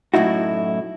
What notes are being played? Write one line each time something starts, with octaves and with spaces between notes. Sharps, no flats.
F#2 A2 D#4 E4 F#4